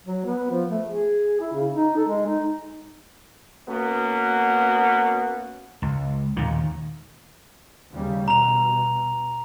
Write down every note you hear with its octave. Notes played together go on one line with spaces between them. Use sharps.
F#3
B3
F3
A3
G#4
E4
C#3
D#4
A4
G#3
D#4
A#3 B3 C#4 F#4
C#2
D#2 A#2 D#3
D#2 C#3 G3
B2 A#5 F7